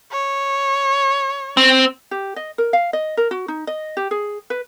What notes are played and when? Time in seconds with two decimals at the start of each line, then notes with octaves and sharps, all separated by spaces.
0.11 C#5
1.57 C4
2.11 G4
2.36 D#5
2.58 A#4
2.73 F5
2.93 D#5
3.17 A#4
3.31 F#4
3.48 D#4
3.67 D#5
3.97 G4
4.11 G#4
4.50 B4